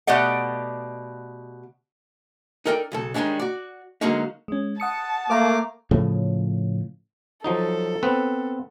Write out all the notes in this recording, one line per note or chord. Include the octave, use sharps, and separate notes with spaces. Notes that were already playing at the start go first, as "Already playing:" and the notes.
B2 A3 G4 D5 D#5 F#5
D#4 A4 A#4 D5 F5 G5
B1 C#3 A4
D#3 G3 G#3 C#4 D4
F#4 D5
D3 F#3 G#3 A#3 C#4 D#4
G#3 C#4
F#5 A5 D#6 C#7
A3 A#3 A#4 F5 A#5 D6
A2 C#3 F3
F3 F#3 D#4 A4
B3 C4 B4